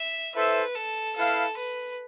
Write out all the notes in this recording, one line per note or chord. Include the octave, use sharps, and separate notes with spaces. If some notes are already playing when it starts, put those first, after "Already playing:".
Already playing: E5
E4 A4 B4 C5 E5
A4
E4 A4 B4 F5
B4